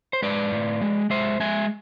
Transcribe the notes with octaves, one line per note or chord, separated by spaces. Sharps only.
C5
G#3 B4 D5
A2
G#3
G#3 C5 E5
G#3 E5 G#5